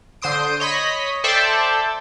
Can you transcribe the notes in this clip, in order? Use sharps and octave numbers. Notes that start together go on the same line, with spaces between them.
D3 C5 C6 D#6 D7
C#5 D#5 B5 B6
A4 C5 D5 E5 G5 A5